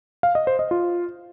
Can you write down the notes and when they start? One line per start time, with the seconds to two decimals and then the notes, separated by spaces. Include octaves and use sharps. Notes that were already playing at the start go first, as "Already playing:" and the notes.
0.23 F5
0.35 D#5
0.47 C5
0.59 D#5
0.71 F4